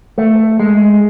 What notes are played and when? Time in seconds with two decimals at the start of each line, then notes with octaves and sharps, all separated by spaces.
0.18 A3
0.60 G#3